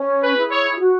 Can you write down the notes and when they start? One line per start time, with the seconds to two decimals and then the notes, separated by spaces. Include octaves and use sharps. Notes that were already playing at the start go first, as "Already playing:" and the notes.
Already playing: C#4
0.23 B4
0.36 E4 G#4
0.51 C#5
0.79 F#4